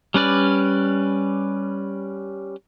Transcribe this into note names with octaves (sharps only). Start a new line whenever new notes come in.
G3 C#4 B4 D5